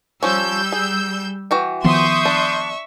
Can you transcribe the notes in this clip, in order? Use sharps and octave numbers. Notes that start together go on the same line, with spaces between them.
F3 G3 C#4 E6 G6
G#4
E3 F#4 G5
D#3 F3 B3 E5 C6 C#6 D#6 G6
D4